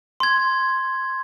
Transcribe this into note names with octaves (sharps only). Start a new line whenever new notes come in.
C6 G#6